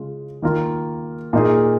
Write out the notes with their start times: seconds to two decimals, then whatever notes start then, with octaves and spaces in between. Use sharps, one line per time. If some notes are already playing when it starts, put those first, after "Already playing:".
Already playing: C#3 G#3 F4
0.42 D#3 A#3 F4 A#4
1.33 A#2 A#3 D#4 G#4